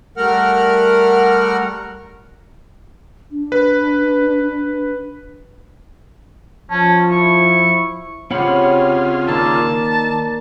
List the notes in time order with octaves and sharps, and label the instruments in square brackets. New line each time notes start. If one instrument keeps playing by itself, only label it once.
[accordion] G3 A3 A#4 F#5 F6
[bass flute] D4
[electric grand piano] B4
[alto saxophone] F3 [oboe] C#4 [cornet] A5
[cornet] E4 [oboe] C#6
[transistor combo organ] C#3 F4 [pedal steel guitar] C4 F#5 B5 [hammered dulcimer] G4 C#5
[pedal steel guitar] D#3 E6 [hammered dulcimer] A#3 D5 [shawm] A5